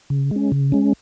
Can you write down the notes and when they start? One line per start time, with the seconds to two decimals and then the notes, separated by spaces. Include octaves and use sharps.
0.10 C#3
0.31 G#3 C#4
0.52 C#3
0.72 G#3 C#4